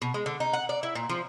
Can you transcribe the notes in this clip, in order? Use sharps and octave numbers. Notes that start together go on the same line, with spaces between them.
B2
G#3
D3
D#4
F#5
D5
E4
A#2
F3